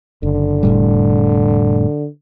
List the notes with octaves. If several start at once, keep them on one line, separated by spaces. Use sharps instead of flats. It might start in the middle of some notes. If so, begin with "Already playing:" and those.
F#1 D3
F1 A2 G3